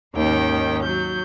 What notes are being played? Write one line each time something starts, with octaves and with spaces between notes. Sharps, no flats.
D#2 G#2 D#3 C#4 G5
F#3 G6